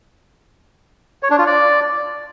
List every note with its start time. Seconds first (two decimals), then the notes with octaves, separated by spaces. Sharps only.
1.23 C#5
1.31 D4
1.38 F4
1.46 D5